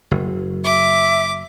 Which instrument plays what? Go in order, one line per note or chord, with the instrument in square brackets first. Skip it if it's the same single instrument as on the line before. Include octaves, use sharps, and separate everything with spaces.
[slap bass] F#1
[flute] E5 [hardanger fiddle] D6